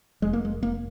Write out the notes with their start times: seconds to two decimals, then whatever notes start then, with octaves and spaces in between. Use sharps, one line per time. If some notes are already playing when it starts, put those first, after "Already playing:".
0.22 F1 G#3
0.33 A#3
0.45 G#3
0.62 F1 A#3